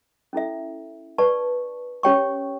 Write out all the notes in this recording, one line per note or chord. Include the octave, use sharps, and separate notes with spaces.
C#4 E4 A4 E5
B4 D5 A5 C#6
C#4 G4 C#5 G5 C#6